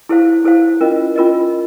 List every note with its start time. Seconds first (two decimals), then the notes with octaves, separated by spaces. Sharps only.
0.09 E4 A4 C5 F5
0.45 E4 A4 C5 F5
0.81 C#4 F4 A#4 D#5
1.16 C#4 F4 A#4 D#5